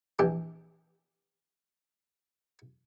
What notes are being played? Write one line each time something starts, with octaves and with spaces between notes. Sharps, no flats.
A#1 E3 D4 G4